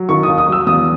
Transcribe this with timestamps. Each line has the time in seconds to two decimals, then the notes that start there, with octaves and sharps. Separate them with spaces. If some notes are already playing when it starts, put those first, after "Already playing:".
Already playing: F#3
0.09 D#3 C#6
0.23 D#6
0.28 D#2
0.38 D#6
0.48 F#3 E6
0.66 E2 D#6